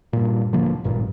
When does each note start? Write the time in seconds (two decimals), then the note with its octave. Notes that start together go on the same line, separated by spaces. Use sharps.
0.13 G2 A#2
0.53 D1 D3 F3 A#3
0.84 G#1 G2 A#2